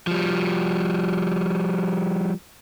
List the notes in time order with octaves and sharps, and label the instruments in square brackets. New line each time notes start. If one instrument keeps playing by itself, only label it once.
[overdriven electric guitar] F3 G3